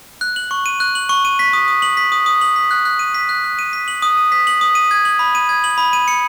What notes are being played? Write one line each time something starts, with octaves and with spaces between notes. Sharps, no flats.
F#6
F#7
C#6
D#7
F#6
F#7
C#6
D#7
B6
D#6
D#6
F#7
B6
D#6
D#6
F#7
B6
F#6
F#6
D#7
B6
F#6
F#6
D#7
B6
F#7
D#6
D#7
B6
F#7
D#6
D#7
G#6
F#7
B5
D#7
G#6
F#7
B5
D#7
C#7